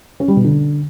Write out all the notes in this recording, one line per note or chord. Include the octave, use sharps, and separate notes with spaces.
C#4
G3
B2
D3